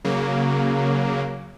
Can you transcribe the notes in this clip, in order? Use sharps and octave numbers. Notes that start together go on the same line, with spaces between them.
C#3 F#3 A#3